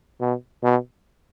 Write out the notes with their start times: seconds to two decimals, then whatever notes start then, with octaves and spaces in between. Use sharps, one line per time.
0.21 B2
0.63 B2